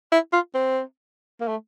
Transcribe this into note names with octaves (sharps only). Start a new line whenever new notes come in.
E4
F4
C4
A#3
A3